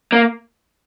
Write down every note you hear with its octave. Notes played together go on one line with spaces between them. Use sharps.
A#3